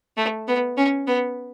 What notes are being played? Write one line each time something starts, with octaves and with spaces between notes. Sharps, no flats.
A3
B3
C#4
B3